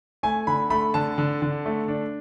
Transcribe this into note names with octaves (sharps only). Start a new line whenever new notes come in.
A3 G#5
D3 B5
A3 B5
D3 A5
D3
D3
A3
D4